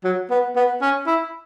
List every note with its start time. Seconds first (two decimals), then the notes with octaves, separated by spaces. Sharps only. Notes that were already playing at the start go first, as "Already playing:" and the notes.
0.04 F#3
0.31 B3
0.56 B3
0.81 C#4
1.07 E4